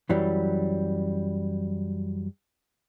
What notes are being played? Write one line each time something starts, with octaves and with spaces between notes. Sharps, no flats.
F#2 E3 F#3 G3